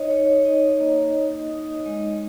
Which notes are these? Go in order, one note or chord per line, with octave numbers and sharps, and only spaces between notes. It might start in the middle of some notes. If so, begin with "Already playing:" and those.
Already playing: D#4 C#5 D#5
D#4 C#5
D#4 D#5
A#3
D#4
D#4
G#3 D#5